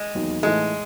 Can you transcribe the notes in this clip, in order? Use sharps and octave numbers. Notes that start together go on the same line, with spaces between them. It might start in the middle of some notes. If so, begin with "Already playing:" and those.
Already playing: G#3
E1 D#2 D#3 F#3
A2 E3 G#3 A3 D#4